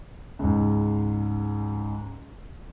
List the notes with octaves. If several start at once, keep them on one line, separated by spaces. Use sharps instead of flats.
C#2 G#2